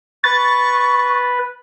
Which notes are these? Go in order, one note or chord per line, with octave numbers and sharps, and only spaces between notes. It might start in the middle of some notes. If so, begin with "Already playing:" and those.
B4 C#6 A6